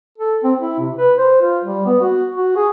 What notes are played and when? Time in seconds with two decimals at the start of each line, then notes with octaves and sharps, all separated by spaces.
0.18 A4
0.44 C4
0.60 E4
0.79 C3
0.97 B4
1.18 C5
1.42 F4
1.64 G3
1.86 B3
2.01 F#4
2.35 F#4
2.56 G#4